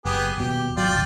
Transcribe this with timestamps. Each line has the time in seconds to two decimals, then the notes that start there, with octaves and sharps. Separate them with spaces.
0.05 F#1 B3 G4 G#4
0.38 D#1 B2 G4
0.77 G#1 F#3 F4 D5 G5
0.91 D1 G1